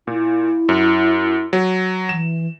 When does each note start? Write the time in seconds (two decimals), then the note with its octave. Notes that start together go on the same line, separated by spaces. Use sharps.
0.07 A#2 E4
0.69 F#2
1.53 F#3
2.09 E3 E7